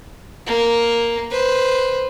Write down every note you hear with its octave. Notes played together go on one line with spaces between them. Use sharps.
A#3
B4 C5